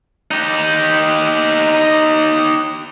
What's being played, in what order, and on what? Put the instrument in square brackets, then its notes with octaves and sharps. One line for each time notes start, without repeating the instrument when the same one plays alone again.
[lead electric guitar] D#4 G4